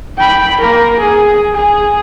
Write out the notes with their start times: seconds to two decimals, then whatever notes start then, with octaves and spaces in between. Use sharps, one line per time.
0.17 G5 B5
0.60 A#3 A#4
1.00 G#4
1.55 G#4